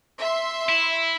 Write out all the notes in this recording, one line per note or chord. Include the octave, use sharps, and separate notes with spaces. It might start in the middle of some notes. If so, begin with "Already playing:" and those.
E5 C6
E4